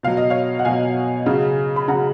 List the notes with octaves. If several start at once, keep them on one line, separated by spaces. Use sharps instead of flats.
B2 F#3 F5
D#5
C#5 F5
F#5
B2 F#3 F5 G#5
C#3 F#3
B5
C#3 F#3 F#5 A#5